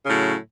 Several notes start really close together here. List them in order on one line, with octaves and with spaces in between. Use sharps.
C#3 A2 F#3